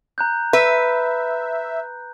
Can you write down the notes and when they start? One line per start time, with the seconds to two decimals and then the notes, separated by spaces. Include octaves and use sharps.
0.18 A#5 F#6 G6
0.53 B4 E5